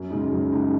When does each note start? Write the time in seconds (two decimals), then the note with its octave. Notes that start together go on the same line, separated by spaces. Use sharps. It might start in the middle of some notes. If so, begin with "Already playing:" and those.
Already playing: F#2
0.10 C#3 G#3 D#4
0.32 F#2
0.52 C#3 G#3 D#4